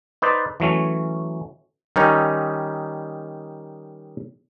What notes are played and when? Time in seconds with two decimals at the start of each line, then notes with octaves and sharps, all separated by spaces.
0.22 D#4 B4 C5 D5
0.60 E3 F#3 A3 C#4
1.96 D#3 G3 C#4 D#4